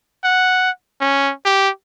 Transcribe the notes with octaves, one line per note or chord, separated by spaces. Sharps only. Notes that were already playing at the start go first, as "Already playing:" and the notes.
F#5
C#4
G4